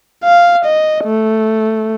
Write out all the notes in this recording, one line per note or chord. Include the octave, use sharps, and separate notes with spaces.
F5
D#5
A3